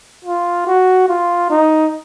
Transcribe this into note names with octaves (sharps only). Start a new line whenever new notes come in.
F4
F#4
F4
D#4